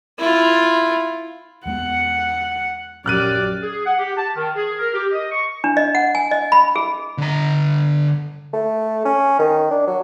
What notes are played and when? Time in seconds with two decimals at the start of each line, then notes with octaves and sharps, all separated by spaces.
0.18 E4 F4
1.66 E2 G#3 B3 F#5
3.06 A#1 F#2 G4 D5 F6 F#6 D#7
3.62 G#4
3.86 F#5
3.99 G4
4.17 A5
4.36 D#3
4.55 G#4
4.78 A#4
4.93 G4
5.12 D#5
5.31 C#6
5.64 D4
5.77 D#5
5.95 F#5
6.15 G#5
6.31 D#5
6.52 B5
6.76 G#4
7.18 D3 A#5
8.53 A3
9.05 C#4
9.39 D#3
9.71 D4
9.87 F#3